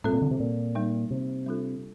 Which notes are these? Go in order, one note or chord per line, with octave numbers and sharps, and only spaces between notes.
A2 G3 C4 F4 A4
A#2
D3
C3
A#2
G3 A#3 D#4
C3
G3 D4 F4 A4